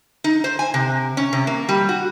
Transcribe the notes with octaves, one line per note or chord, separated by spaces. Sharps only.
D#4
C5
G#5
C3
C#4
C3
A#3
G3
F#4